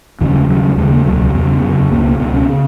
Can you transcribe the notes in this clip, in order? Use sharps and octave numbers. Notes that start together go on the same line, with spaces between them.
D#2 C#3 E3
F#3
G#3
D#2 C#3 F#3
D#2 C#3 G#3
A#3
C#2 B2 F#3
E2 C#3 B3
F#2 C#3
C#2 B2 A#3
C#2 B2 B3
C#4
C#3